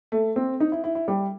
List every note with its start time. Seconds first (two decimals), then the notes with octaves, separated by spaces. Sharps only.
0.12 A3
0.36 C4
0.60 D#4
0.72 E4
0.84 E4
0.95 E4
1.08 G3